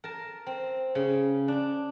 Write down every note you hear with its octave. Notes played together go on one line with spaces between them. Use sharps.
A#4 A5
C4
C#3
D4